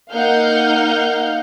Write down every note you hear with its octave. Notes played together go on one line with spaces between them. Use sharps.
A#3 D#4 F5 F#5 F6 G6